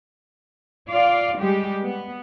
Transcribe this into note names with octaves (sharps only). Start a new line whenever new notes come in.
F4 D5 F5
G3 G#3 G4
B3